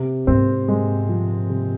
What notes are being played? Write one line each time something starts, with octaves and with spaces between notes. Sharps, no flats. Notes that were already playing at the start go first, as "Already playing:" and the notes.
Already playing: C3
G#2 C4
G#3
F3
C3